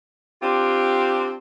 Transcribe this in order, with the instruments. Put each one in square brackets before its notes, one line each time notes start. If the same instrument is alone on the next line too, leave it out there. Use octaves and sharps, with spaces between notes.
[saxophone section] C4 D4 F4 G4